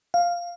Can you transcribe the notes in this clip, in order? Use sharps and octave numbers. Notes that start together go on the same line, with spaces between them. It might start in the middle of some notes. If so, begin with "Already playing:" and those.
F5